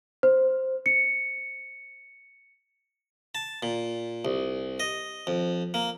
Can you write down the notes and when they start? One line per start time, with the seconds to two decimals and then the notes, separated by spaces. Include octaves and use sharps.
0.23 C5
0.86 C#7
3.35 A5
3.63 A#2
4.25 C2
4.80 D#5
5.27 F2
5.74 A#3